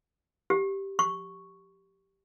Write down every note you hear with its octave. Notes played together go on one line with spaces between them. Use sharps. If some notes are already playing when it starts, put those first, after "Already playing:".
G4
C#6